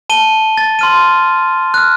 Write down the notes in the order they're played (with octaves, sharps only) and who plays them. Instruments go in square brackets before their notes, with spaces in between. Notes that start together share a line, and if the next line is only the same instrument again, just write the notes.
[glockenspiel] A5 D#7 G7
A6
C6 F6 D#7
F6 F#6